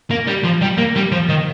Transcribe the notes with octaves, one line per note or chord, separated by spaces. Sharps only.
A#3
G3
F3
G3
A#3
G3
F3
D#3